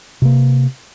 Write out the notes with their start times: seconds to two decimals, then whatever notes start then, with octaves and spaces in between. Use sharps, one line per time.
0.22 C3 A#3